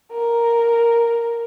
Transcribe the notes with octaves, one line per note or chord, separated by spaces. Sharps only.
A#4